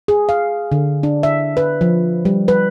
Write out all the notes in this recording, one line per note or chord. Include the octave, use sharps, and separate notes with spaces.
G#4
F5
D3
D4
E5
B4
F3
G3
B4